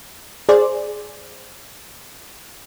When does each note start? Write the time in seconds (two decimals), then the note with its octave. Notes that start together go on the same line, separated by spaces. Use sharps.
0.49 G#4 C5 D5